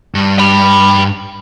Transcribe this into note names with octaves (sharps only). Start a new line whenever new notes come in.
G2
G5 B5